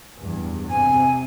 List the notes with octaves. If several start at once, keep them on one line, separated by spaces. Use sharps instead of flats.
E2 G2
C3 G#5